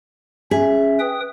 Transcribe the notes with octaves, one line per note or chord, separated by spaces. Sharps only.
C#4 G#4 E5
B4 G5 D#6